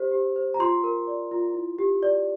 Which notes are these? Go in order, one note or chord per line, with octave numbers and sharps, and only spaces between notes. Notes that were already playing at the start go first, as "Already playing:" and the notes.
Already playing: G4 C5
G4
C5
A#5
F4 C6
A#4
D5
F4
E4
G4
D5